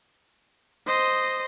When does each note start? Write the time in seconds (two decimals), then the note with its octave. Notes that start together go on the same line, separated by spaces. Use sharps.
0.87 C5 D#5